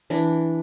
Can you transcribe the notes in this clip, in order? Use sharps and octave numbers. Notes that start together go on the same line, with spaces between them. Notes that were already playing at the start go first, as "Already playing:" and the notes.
E3 D4